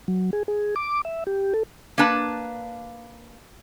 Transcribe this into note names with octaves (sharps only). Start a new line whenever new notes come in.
F#3
G#4
G#4
D6
E5
G4
A4
A#3 D4 B4 A5